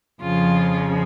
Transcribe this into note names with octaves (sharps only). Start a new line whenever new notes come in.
F2 C#3 F3 F4